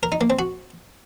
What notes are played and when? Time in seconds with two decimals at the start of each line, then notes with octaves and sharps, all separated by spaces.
0.03 A#4
0.12 D#4
0.21 A#3
0.30 C4
0.39 F#4